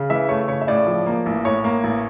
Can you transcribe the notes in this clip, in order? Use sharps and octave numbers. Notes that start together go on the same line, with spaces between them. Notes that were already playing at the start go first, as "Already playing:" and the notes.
Already playing: C#3
E3 E5
A3 C#5
C#3 C#5
E5
A2 D5
F3
A#3
A1
A2 C#5
A#3
A1